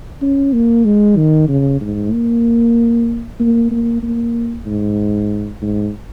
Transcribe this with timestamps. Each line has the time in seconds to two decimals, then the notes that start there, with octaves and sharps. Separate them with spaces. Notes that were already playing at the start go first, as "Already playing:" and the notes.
0.22 C#4
0.53 A#3
0.85 G#3
1.17 D#3
1.48 C#3
1.81 G#2
2.12 A#3
3.40 A#3
3.71 A#3
4.03 A#3
4.66 G#2
5.62 G#2